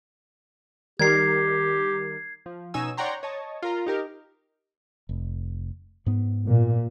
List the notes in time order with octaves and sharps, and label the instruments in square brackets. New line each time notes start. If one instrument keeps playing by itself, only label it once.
[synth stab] D#3 G3 A#4 [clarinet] G4 [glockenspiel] G#6 C7
[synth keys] F3
B2 C#4 D#4 G#5 E6
C#5 D5 F#5 G5 A#5 C6
C#5 D#5 A5
F4 A#4 A#5
D#4 G4 A#4
[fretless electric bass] F1
G#2 B3
[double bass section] A#2